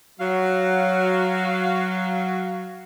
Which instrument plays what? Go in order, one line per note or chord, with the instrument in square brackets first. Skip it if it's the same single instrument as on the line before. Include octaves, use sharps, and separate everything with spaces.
[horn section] F#3 [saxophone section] F#4 F5